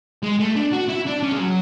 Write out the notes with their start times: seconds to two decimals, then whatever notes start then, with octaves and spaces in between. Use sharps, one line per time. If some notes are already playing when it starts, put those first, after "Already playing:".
0.23 G#3
0.40 A3
0.56 D4
0.73 F#4
0.89 E4
1.07 D4
1.23 C#4
1.32 G#3
1.40 F#3